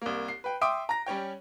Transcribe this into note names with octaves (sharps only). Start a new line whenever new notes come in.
C2 A#3
C7
B4 G5
E5 G5 C6 D6 D#6 D7
A#5 A#6
G3 C#4 C#5 G5